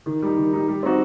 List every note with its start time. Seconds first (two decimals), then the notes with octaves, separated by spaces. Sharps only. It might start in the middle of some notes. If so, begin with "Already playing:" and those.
0.06 D#3
0.22 G3 D#4
0.37 D#3
0.53 G3 D#4
0.68 G3
0.83 C4 D#4 F#4